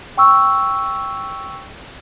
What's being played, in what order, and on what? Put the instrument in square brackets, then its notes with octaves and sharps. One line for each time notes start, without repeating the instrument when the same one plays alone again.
[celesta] G5 C#6 E6